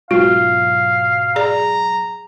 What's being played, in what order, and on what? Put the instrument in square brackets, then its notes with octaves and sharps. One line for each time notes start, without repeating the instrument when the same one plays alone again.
[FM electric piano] G#2 B2 F#3 [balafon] F4 [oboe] F5
[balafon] G#4 D5 [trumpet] A#5